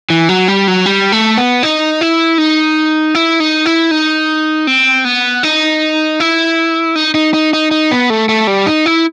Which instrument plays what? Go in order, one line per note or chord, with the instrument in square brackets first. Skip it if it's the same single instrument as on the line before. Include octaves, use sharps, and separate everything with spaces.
[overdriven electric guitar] E3
F#3
G3
F#3
G3
A3
B3
D#4
E4
D#4
E4
D#4
E4
D#4
C4
B3
D#4
E4
D#4
D#4
D#4
D#4
D#4
B3
A3
A3
G3
D#4
E4